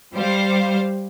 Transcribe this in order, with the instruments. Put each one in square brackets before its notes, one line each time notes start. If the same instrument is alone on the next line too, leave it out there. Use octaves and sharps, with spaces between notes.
[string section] G3 C5 F5